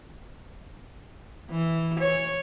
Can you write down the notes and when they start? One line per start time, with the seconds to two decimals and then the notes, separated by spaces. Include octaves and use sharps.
1.50 E3
1.99 C#5